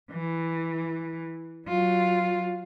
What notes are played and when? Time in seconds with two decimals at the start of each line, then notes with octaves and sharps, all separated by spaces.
0.12 E3
1.68 F#3 F4